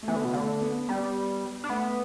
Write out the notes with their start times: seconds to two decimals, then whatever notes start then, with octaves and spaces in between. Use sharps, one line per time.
0.03 A3
0.08 E3 B3
0.16 D3
0.25 B2
0.33 D3 A3
0.61 B3
0.89 G3 B3
1.64 D4
1.69 A3 B3